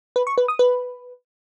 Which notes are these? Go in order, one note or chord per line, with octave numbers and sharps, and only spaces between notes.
B4
C#6
B4
D#6
B4